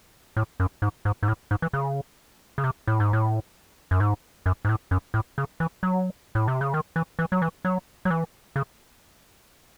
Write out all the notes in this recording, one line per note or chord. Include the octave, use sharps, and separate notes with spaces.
A2
F#2
G#2
G#2
G#2
A2
G#2
E3
C#3
C#3
C3
A2
G#2
A2
F#2
G#2
F#2
G#2
A2
F#2
A2
C#3
E3
F#3
A2
C3
C#3
D#3
E3
E3
F#3
E3
F#3
F#3
E3
C#3